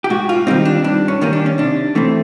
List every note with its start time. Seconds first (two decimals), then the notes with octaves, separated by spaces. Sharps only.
0.04 G4
0.10 G#2 F#4
0.29 F4
0.47 D#3 G3 C4 D#4
0.65 D4
0.84 G2 D4
1.08 C#4
1.21 D#3 G3 A#3 C#4
1.33 D4
1.46 C#4
1.58 C3 D4
1.95 E3 A3 C4